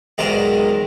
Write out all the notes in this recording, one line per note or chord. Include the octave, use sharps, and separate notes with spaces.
B1 G#2 D#3 G#3 D5 A#5